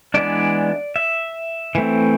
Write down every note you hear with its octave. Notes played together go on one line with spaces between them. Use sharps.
E3 G#3 B3 D4 D5
E5
E3 A3 C4